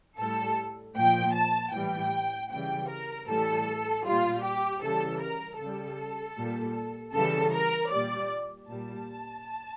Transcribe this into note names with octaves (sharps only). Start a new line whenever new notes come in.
A2 G3 A4
A#2 F3 G5
A5
A2 E3 G3 G5
C#3 E3 G3 G5
A#4
A2 E3 G3 A4
A#2 G3 F4
G4
C#3 E3 G3 A4
A#4
C#3 G3 A4
A#2 G3
C#3 E3 G3 A4
A#4
A#2 G3 D5
A#2 G3 A5